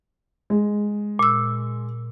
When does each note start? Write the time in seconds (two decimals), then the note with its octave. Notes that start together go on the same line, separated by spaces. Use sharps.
0.50 G#3
1.19 A#2 E6